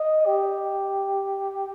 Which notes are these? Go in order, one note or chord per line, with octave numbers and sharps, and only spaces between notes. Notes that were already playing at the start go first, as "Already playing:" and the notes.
Already playing: D#5
G4